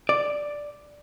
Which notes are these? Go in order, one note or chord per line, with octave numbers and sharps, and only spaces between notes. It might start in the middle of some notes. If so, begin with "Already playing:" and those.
D5